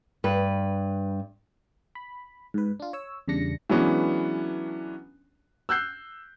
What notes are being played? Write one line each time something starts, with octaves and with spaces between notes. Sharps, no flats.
G2 B4
B5
G#2 B4
D4 F4
C#5 E6
E2 C#3 G3 D4 A#6 C#7
E3 F#3 G#3 B3 C#4 D4
E6 F#6 G6 C7